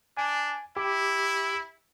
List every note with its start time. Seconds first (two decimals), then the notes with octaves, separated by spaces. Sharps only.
0.17 D4 G#5
0.77 E4 G4